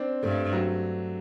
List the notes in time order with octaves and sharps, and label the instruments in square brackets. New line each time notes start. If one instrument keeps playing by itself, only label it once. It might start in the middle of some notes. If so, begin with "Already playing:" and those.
Already playing: [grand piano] C4 D4
[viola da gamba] G2 [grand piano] A3
[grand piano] F#3